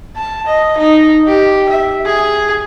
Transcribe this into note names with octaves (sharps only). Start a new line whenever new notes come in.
A5
D#5
D#4
G4
E5
G#4